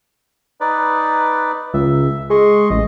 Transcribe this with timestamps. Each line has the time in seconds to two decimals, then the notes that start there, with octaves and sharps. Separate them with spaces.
0.61 D#4 B4 D5
1.74 C#2 E5
2.30 G#3 D#5 C6 C#6
2.70 A1 D#5